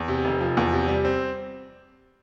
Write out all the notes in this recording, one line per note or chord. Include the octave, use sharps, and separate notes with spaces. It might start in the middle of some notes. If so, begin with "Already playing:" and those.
Already playing: E2
C3
F1
F3
E2
C3
G3
C4